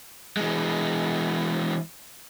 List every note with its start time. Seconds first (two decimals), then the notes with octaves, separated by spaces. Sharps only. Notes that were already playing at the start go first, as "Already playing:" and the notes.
0.37 E3 G#3